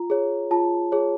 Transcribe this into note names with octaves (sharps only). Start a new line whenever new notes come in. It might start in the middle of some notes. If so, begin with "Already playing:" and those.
Already playing: F4 A#5
G#4 C#5
F4 A5
G#4 C#5